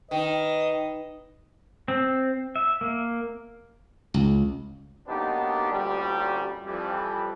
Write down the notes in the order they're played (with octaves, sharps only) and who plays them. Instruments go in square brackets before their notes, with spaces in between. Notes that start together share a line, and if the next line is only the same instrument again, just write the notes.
[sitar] D#3 [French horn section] B4 [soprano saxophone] D#5
[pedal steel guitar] C4
E5
A#3
[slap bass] C#2
[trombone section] B1 A#3 B3 D4 D#4 G4
A1 D2 A#2 G3
F2 E3 G3